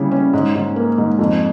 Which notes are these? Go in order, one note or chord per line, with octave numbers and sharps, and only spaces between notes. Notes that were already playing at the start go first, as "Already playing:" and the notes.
Already playing: C#3 G3 E4
C#4
G#2
G#2
A#3
G#2
F2